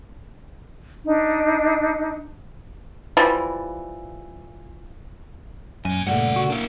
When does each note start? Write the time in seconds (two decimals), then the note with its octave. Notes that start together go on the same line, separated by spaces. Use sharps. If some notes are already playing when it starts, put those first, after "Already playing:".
1.04 D4 D#4
3.17 E3 F3 G3
5.85 F#2 A#2 G#5
6.07 G2 A#2 C#3 A3 F#5
6.36 F#4
6.50 A#3 D4 E4